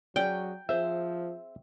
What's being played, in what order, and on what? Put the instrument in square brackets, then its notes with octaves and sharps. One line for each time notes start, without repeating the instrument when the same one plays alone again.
[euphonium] F#3 [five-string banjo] C#4 G#4 D5 [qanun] G5
[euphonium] F3 [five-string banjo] C4 G#4 C5 [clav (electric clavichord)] E5